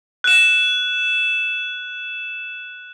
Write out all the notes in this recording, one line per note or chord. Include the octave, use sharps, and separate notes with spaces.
F#6 E7